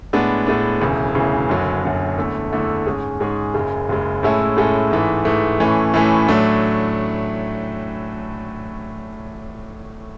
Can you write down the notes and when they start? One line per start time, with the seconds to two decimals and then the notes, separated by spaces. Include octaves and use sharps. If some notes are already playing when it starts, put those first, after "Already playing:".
0.13 A2 G#3 B3 D4
0.47 A2 G#3 B3 D4
0.81 E1 D2 C#3 E3
1.15 E1 D2 C#3 E3
1.49 F#1 F#2 D3 F#3
1.84 F#1 F#2 D3 F#3
2.18 E2 D3 A3 E4
2.52 E2 D3 A3 E4
2.86 G#2 G#3 C#4 G#4
3.20 G#2 G#3 C#4 G#4
3.54 F#1 F#2 C#3 G#3
3.89 F#1 F#2 C#3 G#3
4.23 A2 G#3 C#4 E4 A4
4.57 A2 G#3 C#4 E4 A4
4.91 G#2 E3 A3
5.25 G#2 E3 A3
5.60 A2 E3 A3 C#4
5.94 A2 E3 A3 C#4
6.28 A2 F#3 A3 D4